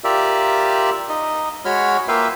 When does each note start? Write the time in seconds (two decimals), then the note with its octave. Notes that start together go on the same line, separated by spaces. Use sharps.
0.04 F4 G4 A#4 D5 E5
1.09 D#4 D#5
1.65 G#3 F#4 C#5 B5 F6
2.08 A#3 F4 B4 E5 F5 G5